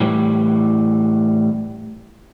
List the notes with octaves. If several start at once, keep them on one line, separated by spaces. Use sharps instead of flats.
A2 E3 G3